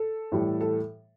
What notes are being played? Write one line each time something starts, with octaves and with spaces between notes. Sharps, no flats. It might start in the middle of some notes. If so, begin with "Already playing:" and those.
Already playing: A4
A2 E3 G3
A4